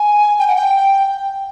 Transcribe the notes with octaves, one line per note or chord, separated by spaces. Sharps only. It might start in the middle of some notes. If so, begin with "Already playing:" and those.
Already playing: G#5
G5
F#5
G5